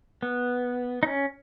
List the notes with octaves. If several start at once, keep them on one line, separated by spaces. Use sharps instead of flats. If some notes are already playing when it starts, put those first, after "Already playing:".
B3
D#4
C#4